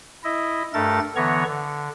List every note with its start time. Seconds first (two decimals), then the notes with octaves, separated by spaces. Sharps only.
0.24 E4 D#5
0.74 G2 A3 A4 A#4 A6
1.16 D3 E3 B3 C#5 A#5 C#6
1.48 D3